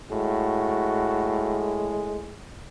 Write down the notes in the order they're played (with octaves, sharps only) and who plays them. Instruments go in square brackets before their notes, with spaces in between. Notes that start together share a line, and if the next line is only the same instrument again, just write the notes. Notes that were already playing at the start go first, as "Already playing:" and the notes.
[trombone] A2 [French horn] G#3 [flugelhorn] F#4